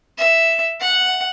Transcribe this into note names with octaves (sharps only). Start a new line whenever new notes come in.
E5
F#5